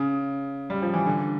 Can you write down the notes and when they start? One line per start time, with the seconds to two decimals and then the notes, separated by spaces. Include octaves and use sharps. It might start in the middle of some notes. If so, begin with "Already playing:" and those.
Already playing: C#3
0.70 G3
0.82 F3
0.94 E3
1.06 D3